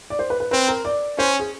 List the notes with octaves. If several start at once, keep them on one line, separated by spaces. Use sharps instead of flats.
D5
C5
B4
B4
C4 B4
A#4
D5
C#4 C5
G#4